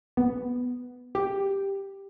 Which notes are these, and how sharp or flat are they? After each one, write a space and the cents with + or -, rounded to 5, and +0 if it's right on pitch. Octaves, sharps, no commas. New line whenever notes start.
B3 +5
G4 +5